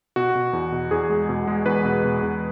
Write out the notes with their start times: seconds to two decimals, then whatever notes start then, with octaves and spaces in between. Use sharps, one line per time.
0.16 B2 F#4
0.35 B2
0.53 E2
0.72 B2
0.91 E2 G#4
1.10 G#3
1.29 B2
1.47 G#3
1.65 E2 B4
1.85 B2
2.04 B2
2.23 E2